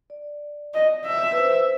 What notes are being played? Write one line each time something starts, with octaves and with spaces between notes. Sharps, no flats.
D5
D#5
E5
B4
C5